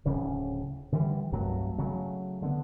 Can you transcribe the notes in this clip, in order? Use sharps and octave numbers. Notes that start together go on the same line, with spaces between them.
D1 C#3 C#4
D3 E3 G3
C2 G2 F#3 A3
C#3 F#3 A3
D3 B3